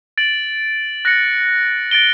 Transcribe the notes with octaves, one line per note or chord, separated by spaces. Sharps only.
A6 D7 F#7
F#6 A#6 C#7
A6 D7 G7